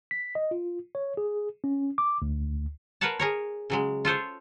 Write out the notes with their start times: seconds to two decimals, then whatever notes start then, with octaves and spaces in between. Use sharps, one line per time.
0.11 B6
0.35 D#5
0.51 F4
0.95 C#5
1.17 G#4
1.64 C#4
1.98 D6
2.22 D2
3.01 A#4 B4 C#5 F5 F#5 A5
3.19 G#4 A#4 C#5
3.70 C#3 F#3 G#3
4.05 F4 A4 C5 C#5